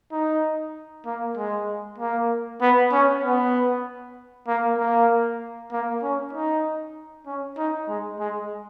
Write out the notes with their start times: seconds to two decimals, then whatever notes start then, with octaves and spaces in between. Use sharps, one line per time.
0.12 D#4
1.06 A#3
1.37 G#3
1.98 A#3
2.61 B3
2.92 C#4
3.23 B3
4.47 A#3
4.78 A#3
5.72 A#3
6.03 C#4
6.33 D#4
7.27 C#4
7.58 D#4
7.89 G#3
8.20 G#3